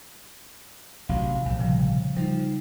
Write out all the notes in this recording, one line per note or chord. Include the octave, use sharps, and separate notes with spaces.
A1 C3 F#3 F5
A#1 C3
C#3 F3 G3
F3 G3 D#4